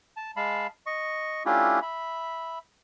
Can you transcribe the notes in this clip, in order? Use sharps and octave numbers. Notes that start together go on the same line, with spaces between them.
A5
G#3 F5 A5 B5
D#5 C#6
A3 C#4 D4 E4 F4 G4
E5 B5